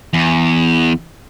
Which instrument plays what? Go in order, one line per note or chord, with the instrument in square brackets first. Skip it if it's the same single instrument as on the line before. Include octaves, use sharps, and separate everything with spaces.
[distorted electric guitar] E2